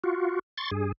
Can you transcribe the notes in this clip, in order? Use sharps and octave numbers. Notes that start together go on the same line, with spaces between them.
F4 F#4
C6 C#6 A6
G2 G#4